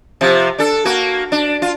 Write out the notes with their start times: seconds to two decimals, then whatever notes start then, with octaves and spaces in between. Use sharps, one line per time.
0.21 C3 F3
0.58 D4 A4
0.85 A#3 F#4
1.32 D4
1.62 F4